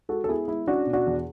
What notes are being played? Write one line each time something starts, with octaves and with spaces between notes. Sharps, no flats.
G#3 F#4 A4
A4
B3 E4 G#4
G#3 E4
C#4 D4 F#4
B2
D4 F#4
E2